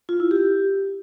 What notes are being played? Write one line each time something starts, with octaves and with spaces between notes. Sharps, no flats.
F4
E4
G4